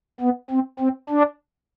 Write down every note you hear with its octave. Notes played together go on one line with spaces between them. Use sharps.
B3
C4
C4
D4